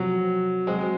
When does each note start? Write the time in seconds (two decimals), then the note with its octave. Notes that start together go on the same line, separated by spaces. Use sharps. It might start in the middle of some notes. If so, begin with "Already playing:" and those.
Already playing: C3 F3 F#3 C4
0.67 F#3 G#3 C4 F#4
0.79 G#3